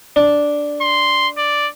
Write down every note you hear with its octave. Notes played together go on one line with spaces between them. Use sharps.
D4
C6
D5